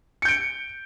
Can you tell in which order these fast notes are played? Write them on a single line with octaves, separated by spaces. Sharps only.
C#7 G6 D7